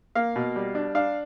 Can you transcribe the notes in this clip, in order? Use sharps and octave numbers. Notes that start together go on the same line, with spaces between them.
A#3 F5
B2
G3
D4
D4 F5